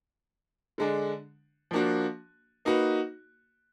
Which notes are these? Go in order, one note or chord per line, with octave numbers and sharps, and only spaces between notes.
D3 G#3 D4
F3 A#3 D4 F#4
A#3 D#4 F#4 B4